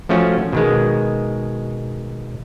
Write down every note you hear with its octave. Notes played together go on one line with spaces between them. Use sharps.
F3 A3 C#4 F#4
B2 D#3 G#3